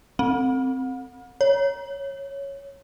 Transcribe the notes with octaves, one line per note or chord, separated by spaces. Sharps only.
C4
C#5